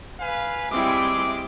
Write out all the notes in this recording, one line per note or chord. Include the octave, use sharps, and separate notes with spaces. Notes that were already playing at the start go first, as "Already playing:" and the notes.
B4 F5 G#5
G3 G#3 C4 E4 D6